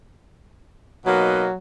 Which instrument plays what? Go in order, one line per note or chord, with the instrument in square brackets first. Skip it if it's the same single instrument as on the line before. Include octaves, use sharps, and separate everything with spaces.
[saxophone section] B2 A#3 D#4 [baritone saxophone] F#3